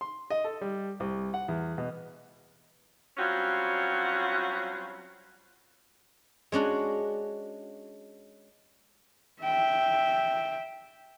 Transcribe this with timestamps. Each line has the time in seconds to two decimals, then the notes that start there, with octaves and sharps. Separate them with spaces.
0.01 C6
0.30 D#5
0.44 A4
0.61 G3
1.00 C2
1.34 F#5
1.48 E2
1.78 B2
3.18 F#3 G3 C4 C#4 F4 F#4
6.52 G#3 C#4 D4 F#4
9.42 E5 G5